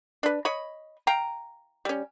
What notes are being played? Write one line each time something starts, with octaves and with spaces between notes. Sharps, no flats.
D4 B4
C#5 D#5 B5
F5 G5 A#5
G3 C#4